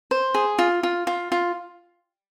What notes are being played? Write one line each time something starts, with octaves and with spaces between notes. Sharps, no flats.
C5
G#4
F4
F4
F4
F4